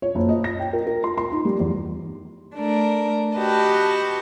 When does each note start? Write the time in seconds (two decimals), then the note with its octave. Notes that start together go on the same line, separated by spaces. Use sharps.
0.02 C#5
0.15 F#1
0.29 D#5
0.44 A#6
0.59 G5
0.73 A#4
0.87 A#4
1.04 C6
1.18 C6
1.32 D#4
1.45 G3
1.60 E2
2.55 A3 D4 A#4
3.36 F#4 G4 B4 D#5 A5